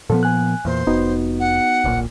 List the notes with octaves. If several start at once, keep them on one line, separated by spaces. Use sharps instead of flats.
A#2 F3 B3 A4
G#5 F#6
E2 A#2 C5
F1 B3 D#4 F#4
F#5
D1 A#1 A#2